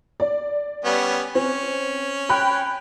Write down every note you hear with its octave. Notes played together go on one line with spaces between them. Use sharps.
D5
G3 B3 C#4
C4 C#4
G5 B5 F#6